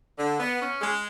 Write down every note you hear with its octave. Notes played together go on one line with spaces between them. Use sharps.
D3
B3
C#4
G#3